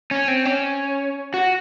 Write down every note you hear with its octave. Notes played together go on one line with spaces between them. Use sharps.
C#4
C4
C#4
F#4